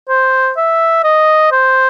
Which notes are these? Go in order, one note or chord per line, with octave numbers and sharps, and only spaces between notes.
C5
E5
D#5
C5